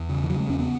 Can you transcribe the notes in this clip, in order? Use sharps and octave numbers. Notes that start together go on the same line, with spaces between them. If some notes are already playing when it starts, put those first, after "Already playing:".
Already playing: E2
C#3
E3
C#3 F#3
G#3
E2 C#4
B3